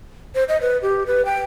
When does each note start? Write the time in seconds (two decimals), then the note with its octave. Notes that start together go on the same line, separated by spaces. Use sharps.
0.35 C5
0.49 D#5
0.61 B4
0.82 G4
1.07 B4
1.25 G5